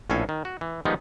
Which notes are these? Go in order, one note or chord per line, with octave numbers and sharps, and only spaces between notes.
A#1 A2 C#4 A4 F5 G#5
D#3
F#4
E3
D#3 F3 G3 G#3 B3 D#4